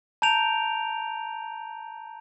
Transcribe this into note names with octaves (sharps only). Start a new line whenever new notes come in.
A5 A#5 G6 D7 F7